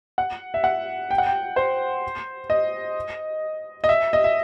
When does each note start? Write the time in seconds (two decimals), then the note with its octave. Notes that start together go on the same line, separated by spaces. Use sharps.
0.18 F#5
0.54 E5
0.64 F#5
1.11 G5
1.18 F#5
1.27 G5
1.56 C5
2.50 D#5
3.84 D#5
3.89 E5
4.13 D#5
4.24 E5